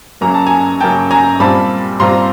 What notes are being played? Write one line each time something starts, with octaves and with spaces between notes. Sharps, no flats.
F#2 C#3 F#3 A#3 C#4 A#5
A5
G#5 A#5
F#2 C#3 F#3 A#3 C#4 G5 A5
G#5 A#5
A#2 G3 C4 F4 A5 B5
A#2 G3 C4 F4 A#5 C6